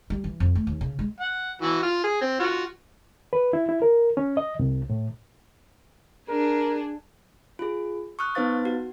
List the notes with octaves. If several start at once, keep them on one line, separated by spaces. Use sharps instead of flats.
G3
E3
F2
A3
D#2
C#3
G#3
F#5
E3 F#4
F4
G#4
C4
F4 F#4
B4
E4
E4
A#4
C#4
D#5
C2
A2
D4 G#4 A#4
F4 G#4
C#6 D#6 F6 F#6
B3 D#4 B4 C5 F5 A6
F#4